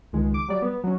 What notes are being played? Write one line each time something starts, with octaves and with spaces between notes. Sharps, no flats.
C#2 D#3 G#3
D6
F#3 G3 D5
B3
F#3 C#4